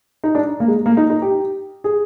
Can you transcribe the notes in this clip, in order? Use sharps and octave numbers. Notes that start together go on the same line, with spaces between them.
D#4
D4
A#3
G#3
A#3
D#4
D#4
G4
G#4